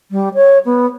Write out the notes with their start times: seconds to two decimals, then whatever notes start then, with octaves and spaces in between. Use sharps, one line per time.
0.11 G3
0.34 C#5
0.65 B3